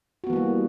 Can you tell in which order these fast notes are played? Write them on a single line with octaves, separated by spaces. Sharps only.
F#4 B3 E3 A#3 G3